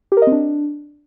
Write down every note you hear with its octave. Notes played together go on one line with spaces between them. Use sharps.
G4
A#4
D#5
C4
D4